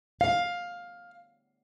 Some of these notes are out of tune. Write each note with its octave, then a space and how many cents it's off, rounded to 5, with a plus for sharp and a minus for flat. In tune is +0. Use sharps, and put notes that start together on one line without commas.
F5 +10